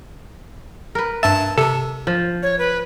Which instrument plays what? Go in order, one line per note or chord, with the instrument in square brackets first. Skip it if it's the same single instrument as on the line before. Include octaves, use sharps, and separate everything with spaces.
[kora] A#4 B4
[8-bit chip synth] G2 A5 A6 [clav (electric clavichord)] E5
[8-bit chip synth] C3 [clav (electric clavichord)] A4
[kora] F3
[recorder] C#5
B4